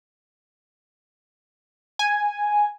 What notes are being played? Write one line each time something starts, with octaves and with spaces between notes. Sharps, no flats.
G#5